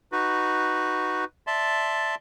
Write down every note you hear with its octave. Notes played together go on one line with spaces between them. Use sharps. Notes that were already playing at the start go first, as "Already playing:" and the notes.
D#4 F#4 B4
D5 E5 A5 C6